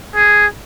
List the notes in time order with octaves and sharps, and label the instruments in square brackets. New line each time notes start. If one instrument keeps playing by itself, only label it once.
[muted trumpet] G#4